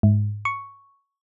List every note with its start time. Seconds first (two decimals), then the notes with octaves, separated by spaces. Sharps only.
0.03 G#2
0.45 C#6